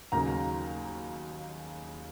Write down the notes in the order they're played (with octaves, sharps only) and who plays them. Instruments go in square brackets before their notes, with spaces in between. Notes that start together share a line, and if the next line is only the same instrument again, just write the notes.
[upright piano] D#2 C#3 F#3 A#3 D#4 A#5